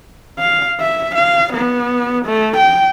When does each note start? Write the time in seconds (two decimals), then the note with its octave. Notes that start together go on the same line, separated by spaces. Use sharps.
0.39 F5
0.80 E5
1.15 F5
1.53 B3
2.26 A3
2.57 G5